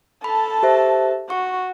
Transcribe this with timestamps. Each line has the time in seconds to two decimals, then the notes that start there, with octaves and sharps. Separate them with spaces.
0.24 A4 A5 B5
0.63 G4 C5 E5
1.30 F#4 C#6